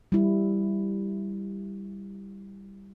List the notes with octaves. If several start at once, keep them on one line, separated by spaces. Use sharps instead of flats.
G3 E4